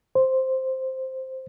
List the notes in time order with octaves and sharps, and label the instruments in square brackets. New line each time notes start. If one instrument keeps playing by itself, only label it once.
[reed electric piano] C5